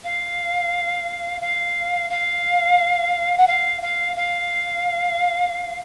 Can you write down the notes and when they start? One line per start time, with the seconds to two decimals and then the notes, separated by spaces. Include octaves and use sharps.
0.04 F5
1.41 F5
2.10 F5
3.37 F#5
3.47 F5
3.82 F5
4.16 F5